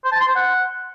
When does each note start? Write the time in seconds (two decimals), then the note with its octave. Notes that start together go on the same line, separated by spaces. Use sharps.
0.04 C5
0.12 A5
0.20 C6
0.28 C5
0.36 F#5